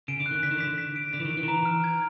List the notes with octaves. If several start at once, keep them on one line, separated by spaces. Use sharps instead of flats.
C#3 D7
D3
F#6
D#3
D3 B6
D#3
D3 B6
B6
D7
D3 B6
E3
D#3
D7
E3
D#3
E3 A#5
F6
G#6